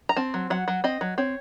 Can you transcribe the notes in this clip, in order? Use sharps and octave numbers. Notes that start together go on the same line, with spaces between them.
A#5
C4 A5
F#3
F#3 F#5
F#3
C4 D#5
F#3
C4 C#5